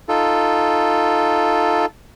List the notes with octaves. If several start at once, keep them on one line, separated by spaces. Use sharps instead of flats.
D#4 F4 A4